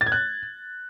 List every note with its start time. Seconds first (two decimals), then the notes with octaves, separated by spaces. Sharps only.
0.01 A6
0.06 G#6
0.12 F#6